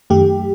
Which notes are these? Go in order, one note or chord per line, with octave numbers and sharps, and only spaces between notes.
F#2 D#3 A3 G4